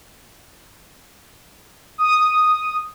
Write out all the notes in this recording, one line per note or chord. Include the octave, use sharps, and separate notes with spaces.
D#6